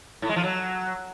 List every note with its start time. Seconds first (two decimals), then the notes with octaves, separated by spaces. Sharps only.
0.22 A2
0.29 G#3
0.36 F3
0.43 F#3